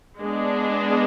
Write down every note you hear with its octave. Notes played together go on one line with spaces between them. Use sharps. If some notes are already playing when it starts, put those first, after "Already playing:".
G#3 B3 D4